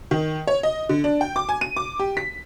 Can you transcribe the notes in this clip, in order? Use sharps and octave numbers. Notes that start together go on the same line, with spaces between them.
D#3
C#5
D#5
D3
D4
G5
D6
G#5
D#7
D6
G4
B6